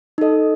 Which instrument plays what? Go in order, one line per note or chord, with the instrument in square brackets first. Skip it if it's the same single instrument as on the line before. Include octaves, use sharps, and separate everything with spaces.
[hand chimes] D#4 A4 D#5